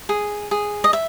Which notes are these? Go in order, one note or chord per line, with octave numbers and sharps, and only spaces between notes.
G#4
G#4
D#5
E5